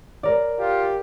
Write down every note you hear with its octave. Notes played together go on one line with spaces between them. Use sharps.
A#4 D5
F4 G4